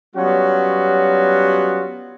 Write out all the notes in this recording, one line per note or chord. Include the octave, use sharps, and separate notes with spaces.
F#3 G3 B3 C#4 F4 F#4